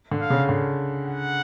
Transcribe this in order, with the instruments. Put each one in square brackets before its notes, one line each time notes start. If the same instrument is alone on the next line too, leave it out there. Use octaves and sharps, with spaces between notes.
[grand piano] D3
[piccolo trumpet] F5
[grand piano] C#3
D3
[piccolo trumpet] F#5